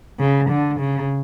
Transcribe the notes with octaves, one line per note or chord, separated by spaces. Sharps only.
C#3
D3
C#3